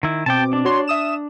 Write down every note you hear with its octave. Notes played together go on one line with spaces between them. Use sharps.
D#3 E4
B2 C4 G5 A5 D6
D4
F#4 C#5 C6
E5 D#6 E7